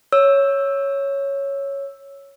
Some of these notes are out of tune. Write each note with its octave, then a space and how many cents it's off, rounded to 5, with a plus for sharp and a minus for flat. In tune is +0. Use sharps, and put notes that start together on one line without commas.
C#5 +0 E6 +0